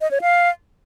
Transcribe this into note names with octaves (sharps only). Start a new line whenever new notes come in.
D#5
C#5
F5